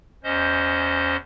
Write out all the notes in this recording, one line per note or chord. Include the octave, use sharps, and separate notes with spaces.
E2 C#4 C5 D#5 G6